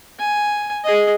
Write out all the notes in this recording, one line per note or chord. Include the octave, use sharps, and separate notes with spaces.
G#5
G#4 D#5